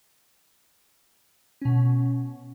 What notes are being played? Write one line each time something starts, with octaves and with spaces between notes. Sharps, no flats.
B2 C#4